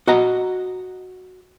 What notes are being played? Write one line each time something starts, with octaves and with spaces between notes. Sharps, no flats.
F#4 D#5 F#5 A#5